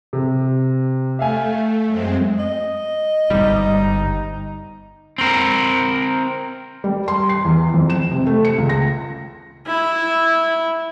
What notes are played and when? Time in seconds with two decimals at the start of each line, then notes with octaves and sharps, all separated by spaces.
0.13 C3
1.19 A3 E5 F5 G#5
1.87 F#2 G#3 C4
2.39 D#5
3.30 G1 G#2 G3 D#4
5.18 C4 A#4
6.84 G3
7.08 C6
7.29 C7
7.45 E2
7.74 F2
7.90 E7
8.11 C3
8.27 A3
8.45 C#7
8.58 C#2
8.69 A#6
9.67 E4